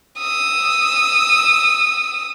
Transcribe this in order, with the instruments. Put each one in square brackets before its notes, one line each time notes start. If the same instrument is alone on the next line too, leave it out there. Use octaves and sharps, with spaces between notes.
[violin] D#6 E6